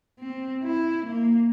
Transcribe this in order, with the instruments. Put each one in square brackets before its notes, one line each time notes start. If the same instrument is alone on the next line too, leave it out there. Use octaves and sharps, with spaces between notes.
[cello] C4
E4
A#3